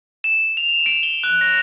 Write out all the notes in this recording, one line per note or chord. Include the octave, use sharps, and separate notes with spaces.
E7
F7
F7
D7
G7
F#6
A#6